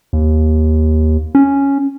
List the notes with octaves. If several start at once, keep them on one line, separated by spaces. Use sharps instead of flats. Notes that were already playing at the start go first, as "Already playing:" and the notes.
D#2
C#4